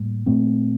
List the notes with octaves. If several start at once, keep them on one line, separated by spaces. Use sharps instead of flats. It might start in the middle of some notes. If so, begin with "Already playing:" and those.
Already playing: A2 G3 A#3
A#2 A3 C4